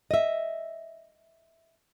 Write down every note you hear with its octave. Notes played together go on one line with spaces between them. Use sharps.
D#5 E5